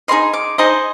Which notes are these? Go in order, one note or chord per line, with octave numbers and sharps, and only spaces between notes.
D#4 G#4 C5 D#5 C6
D6
D#4 G#4 C5 D#5